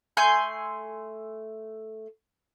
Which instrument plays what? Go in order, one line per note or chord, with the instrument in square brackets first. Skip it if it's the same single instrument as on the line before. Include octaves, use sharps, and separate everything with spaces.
[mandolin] A3 G#5 C6 G6